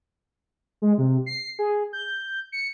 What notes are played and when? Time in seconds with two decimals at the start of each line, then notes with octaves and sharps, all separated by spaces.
0.82 G#3
0.98 C3
1.26 C7
1.59 G#4
1.93 G6
2.52 C#7